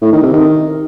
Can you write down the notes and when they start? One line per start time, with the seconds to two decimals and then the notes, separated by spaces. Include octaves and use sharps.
0.02 A2
0.12 D#3
0.23 C3
0.33 D#3